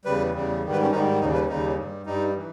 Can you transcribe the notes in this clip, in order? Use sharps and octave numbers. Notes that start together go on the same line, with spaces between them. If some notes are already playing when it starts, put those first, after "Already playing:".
E2 C#3 G3 B4
E2 C#3 G3
G#2 D#3 G3
B4
C#4
G#2 D#3 G3 D#4
D#2 C#3 G3 D#4
B4
D#2 C#3 G3 D#4
G2 G3
G2 G3 D#4
E3